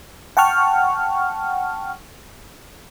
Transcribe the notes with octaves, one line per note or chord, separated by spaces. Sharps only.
F#5 G5 A5 C#6 F6